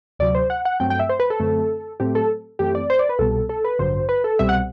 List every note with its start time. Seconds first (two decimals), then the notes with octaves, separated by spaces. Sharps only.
0.19 D2 C3 F#3 D5
0.35 C5
0.50 F#5
0.65 F#5
0.80 G2 F#3 A3 C4 G5
0.90 G5
0.99 E5
1.09 C5
1.20 B4
1.30 A4
1.40 F#2 D3 A3 C4
2.00 A2 F#3 A3 C4 G4
2.15 A4
2.59 F#2 E3 A3 C4 G4
2.75 D5
2.90 C5
2.99 D5
3.09 B4
3.19 C2 B2 G3 B3 A4
3.49 A4
3.64 B4
3.79 A1 G2 D3 F#3 C5
4.09 B4
4.24 A4
4.39 C2 B2 G3 C4 E5
4.49 F#5